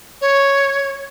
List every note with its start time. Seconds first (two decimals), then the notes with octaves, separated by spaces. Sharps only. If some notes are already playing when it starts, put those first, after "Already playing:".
0.21 C#5